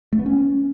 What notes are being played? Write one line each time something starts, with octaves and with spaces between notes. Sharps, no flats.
A3
B3
C#4